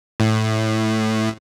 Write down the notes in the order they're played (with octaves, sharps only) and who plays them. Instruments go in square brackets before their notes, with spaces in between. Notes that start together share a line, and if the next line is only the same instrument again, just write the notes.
[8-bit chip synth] A2